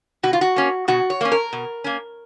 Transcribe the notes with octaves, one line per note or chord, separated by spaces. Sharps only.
B2 F#4
F4
F#4
A#3 C#4
B2 F#4
C#5
A#3 C#4
A#4
B2
A#3 C#4